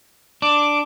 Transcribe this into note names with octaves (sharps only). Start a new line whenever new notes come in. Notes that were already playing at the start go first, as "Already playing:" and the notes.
D4 D6